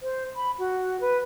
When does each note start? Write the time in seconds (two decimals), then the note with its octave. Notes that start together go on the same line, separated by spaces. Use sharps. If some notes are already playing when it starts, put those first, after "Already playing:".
0.01 C5
0.36 B5
0.59 F#4
1.00 B4